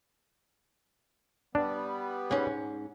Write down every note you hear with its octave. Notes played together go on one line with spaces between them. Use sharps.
G3 B3 D4
G#2 C#4